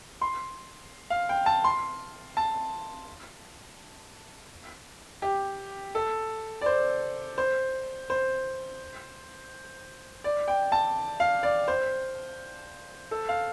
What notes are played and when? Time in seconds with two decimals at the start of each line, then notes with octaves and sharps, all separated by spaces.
0.21 C6
1.10 F5
1.29 G5
1.46 A5
1.64 C6
2.37 A5
5.22 G4
5.95 A4
6.61 D5
6.66 C5
7.38 C5
8.10 C5
10.24 D5
10.48 G5
10.72 A5
11.20 F5
11.43 D5
11.68 C5
13.11 A4
13.29 F5